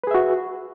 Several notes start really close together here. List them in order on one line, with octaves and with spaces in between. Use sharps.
B4 G#4 E5 F#4